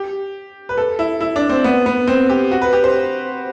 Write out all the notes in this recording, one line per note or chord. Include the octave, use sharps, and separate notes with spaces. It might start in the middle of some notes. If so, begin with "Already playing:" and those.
Already playing: G4
B4
A4
E4
E4
D4
C4
B3
B3
C4
G4
F#4
B4
G4
C5